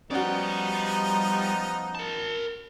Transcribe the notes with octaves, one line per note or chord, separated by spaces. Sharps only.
F3 G3 B3 C#4 D#4 F#4 D5
A#4 A5